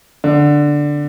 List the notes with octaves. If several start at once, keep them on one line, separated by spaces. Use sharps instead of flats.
D3